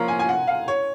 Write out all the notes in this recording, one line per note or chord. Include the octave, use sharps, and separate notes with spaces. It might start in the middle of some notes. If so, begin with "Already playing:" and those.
Already playing: F3 A#3 F4 A#4 C#5 A#5
G#5
G#5
F#5
F5
C#5